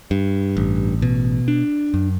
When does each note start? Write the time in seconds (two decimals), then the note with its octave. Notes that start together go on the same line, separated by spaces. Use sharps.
0.11 G2
0.57 A1
1.02 B2
1.48 D4
1.94 F#2